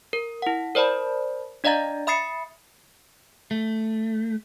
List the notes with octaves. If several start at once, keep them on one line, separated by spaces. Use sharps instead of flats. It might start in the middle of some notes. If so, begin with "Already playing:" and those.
A#4
E4 F#5
A#4 C5 D5 A5 B5
D4 D5 D#5 F5 A#5 A6
E5 B5 D#6 A6 C7 C#7
A3